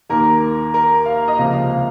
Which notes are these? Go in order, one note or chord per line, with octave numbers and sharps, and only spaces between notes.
D#2 D#3 A#3 A#4
A#4
F5
D#5
C#2 C3 F3 A#3 F5
F5
F5